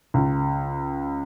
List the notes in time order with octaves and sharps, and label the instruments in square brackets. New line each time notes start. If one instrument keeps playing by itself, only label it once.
[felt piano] C#2